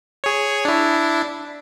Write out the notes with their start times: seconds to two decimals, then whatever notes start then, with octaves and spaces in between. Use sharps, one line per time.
0.24 G#4 C#5
0.65 D4 E4